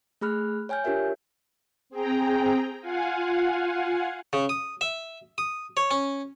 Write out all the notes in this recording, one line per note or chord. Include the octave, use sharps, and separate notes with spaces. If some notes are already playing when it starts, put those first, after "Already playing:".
A3 G#4 B5 F6 F#6
C#5 G5 G#5 F6 G6
D4 F4 G4 A#4 C#5 E5
C4 G#4 G5 A#5
F4 F5 F#5 G#5
C#3
D#6
E5
D#6
C#5
C#4